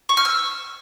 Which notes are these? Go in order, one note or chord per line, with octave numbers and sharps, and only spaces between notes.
C#6
F6
E6